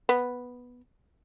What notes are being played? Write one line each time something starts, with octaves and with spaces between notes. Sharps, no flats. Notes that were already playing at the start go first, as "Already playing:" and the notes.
B3